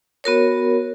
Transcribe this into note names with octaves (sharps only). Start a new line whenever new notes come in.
B3 F#4 A#4 C#5